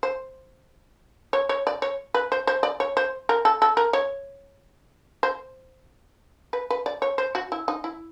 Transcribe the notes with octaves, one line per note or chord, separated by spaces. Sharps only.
C5
C#5
C#5
D5
C#5
B4
C5
C5
D5
C#5
C5
A#4
A4
A4
A#4
C#5
C5
B4
B4
D5
C#5
C5
F#4
E4
D#4
E4